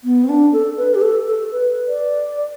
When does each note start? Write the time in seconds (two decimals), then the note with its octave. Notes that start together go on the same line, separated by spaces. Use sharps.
0.04 B3
0.24 C4
0.29 D4
0.53 A4
0.77 B4
0.95 G4
1.02 A4
1.27 A4
1.52 B4
1.88 D5